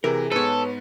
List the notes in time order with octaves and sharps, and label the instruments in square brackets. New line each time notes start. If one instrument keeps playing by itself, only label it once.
[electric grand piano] C3 E3 [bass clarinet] G#4 [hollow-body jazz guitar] A#4
[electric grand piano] G#2 B3 [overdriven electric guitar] A4 [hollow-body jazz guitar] B4 C#5